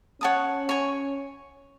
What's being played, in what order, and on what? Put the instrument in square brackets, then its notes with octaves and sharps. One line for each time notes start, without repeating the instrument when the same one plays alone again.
[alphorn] C#4 [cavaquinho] C#5 F#5 A5 D#6
[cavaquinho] C#5 G#5 C#6